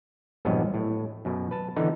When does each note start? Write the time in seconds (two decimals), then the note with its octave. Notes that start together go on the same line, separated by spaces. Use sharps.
0.45 A#1 E2 G2 F#3 B3 D#5
0.74 A2
1.25 F#2 B2
1.51 B4 A5
1.76 D3 E3 B3 D#4